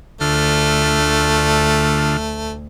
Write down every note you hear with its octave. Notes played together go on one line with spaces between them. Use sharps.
D2 D3 A3 F4